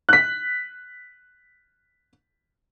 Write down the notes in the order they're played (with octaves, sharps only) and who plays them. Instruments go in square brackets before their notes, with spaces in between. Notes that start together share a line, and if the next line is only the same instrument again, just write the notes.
[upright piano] F#6 B6